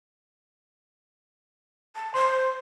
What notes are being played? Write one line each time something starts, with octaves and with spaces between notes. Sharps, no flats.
A5
C5 C6